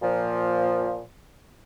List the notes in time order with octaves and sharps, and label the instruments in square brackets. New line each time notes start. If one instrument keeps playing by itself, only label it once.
[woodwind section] A#2 F3